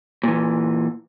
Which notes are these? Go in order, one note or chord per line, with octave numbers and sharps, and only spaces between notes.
A#2 E3